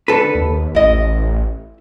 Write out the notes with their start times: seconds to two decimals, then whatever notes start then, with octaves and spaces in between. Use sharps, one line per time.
0.08 D3 A4 B4
0.35 D#2
0.75 A1 E4 D#5